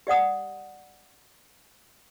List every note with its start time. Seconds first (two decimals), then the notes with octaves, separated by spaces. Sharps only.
0.07 G4 D5 F#5 D#6